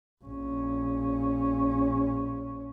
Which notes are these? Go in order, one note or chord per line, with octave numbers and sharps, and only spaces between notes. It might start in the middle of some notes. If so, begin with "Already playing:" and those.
A#1 C#4